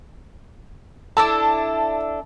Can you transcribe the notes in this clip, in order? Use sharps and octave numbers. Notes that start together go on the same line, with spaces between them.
D4 E4 A4 A5